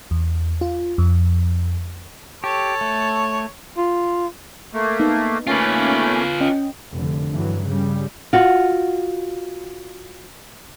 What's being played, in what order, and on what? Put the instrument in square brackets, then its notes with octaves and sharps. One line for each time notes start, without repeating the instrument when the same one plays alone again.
[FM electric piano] E2
F4
F2
[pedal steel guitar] G4 [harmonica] A4 C#5
[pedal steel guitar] A3
[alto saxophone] F4
[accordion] A3 A#3
[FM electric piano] B3 D#4
[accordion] A3 A#3 C#4 [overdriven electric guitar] F4 B4
[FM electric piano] C#4 D#5 G5
[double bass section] F1 D3
G2 E3 F#3
C#3 G3
[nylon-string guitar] F4 F#4